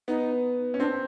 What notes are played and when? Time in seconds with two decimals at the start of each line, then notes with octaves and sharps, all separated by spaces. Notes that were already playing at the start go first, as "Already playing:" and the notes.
0.08 B3 D#4
0.74 C#4
0.80 C4 D4